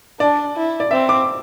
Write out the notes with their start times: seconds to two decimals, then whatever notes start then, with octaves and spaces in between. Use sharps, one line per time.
0.20 D4 D5
0.56 E4
0.80 D5
0.91 C4 E5
1.09 D6